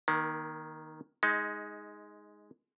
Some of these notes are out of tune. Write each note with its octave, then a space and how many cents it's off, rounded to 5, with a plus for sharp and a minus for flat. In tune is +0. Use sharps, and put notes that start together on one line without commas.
D#3 +0 A#3 +40
G#3 +0 D#4 +20